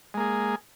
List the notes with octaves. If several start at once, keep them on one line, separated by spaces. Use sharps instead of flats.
G#3 A#3 G#4